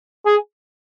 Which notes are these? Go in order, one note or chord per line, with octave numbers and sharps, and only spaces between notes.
G#4